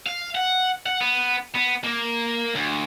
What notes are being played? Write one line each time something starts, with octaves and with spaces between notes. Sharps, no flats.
F5
F#5
F#5
B3
B3
A#3
D2